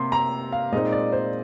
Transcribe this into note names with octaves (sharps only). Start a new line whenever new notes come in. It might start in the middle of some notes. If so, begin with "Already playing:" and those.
Already playing: C3 A#3 C6
A#5
F5
A#2 G#3 C4 D#4 D#5
D5
C5